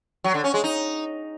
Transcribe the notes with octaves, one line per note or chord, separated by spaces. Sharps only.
F#3
D3
C#4
G#3
D#4